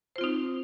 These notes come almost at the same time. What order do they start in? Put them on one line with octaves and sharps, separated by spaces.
C5 F4 C4 D#4